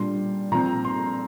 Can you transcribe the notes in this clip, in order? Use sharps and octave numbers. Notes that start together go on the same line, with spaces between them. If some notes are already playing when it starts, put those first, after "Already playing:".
Already playing: A#2 G3 D4 C6
A#2 F3 C4 A#5
C6